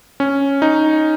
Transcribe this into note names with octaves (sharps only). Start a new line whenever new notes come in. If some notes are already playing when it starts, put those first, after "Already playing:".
C#4
D#4